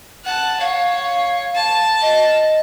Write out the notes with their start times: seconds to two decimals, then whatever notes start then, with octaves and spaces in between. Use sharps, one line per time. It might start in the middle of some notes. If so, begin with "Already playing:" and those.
0.25 F#5 A5
0.60 C#5 F5
1.55 A5
2.02 D#5